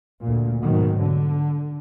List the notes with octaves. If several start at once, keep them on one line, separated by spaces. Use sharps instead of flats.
D2 A#2
G#2 B2 D#3 F#3
D3